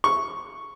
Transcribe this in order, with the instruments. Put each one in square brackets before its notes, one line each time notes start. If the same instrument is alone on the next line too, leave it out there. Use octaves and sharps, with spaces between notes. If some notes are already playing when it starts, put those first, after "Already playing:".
[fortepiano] C#6